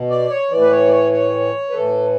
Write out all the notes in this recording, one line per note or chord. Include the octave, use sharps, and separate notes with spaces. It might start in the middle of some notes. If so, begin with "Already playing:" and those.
Already playing: B2
D5
C#5
A2 E3 D5
B4
C#5
D5
C#5
C#5
B4
A2 E3 A4